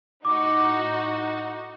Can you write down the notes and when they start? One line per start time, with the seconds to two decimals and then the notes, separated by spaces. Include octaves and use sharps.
0.25 A2 D#4 F#4 D6